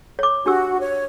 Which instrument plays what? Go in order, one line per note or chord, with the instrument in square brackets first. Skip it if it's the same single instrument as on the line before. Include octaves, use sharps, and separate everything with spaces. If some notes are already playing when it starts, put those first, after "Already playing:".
[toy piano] C#5 D6
[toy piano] D4 G4 E6 [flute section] F#4
[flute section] C#5